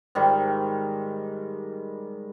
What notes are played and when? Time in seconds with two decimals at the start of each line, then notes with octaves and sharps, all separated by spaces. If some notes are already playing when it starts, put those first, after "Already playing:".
0.15 G#2 D#3 G3